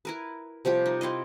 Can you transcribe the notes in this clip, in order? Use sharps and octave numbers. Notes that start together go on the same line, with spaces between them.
E4 A#4 B4
C3 F3 G3 G4
D#4
C4 E4 F4 D#5